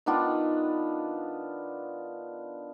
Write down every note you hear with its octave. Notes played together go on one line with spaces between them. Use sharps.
D#3 B3 D4 F4